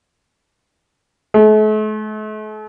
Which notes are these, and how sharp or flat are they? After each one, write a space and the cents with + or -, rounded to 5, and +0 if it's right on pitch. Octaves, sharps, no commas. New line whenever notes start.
A3 -45